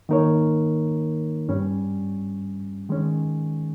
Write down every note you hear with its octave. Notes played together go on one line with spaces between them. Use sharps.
D#3 A#3 D#4 A#4 C#5
G2 G3 C#4
D#3 G#3 C#4